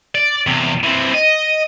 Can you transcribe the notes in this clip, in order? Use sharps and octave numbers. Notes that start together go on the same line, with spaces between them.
D5
E2 C3
E3 C4
D#5